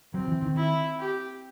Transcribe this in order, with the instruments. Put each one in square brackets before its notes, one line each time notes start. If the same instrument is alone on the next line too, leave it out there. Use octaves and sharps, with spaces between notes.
[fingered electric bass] F#3 [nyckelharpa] C4
[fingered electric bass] E3
D#3
[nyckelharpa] E4
G4